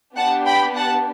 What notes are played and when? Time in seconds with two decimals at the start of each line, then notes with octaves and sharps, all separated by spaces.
0.17 B3 D4 G4 F#5 A5
0.46 G5 B5
0.77 F#5 A5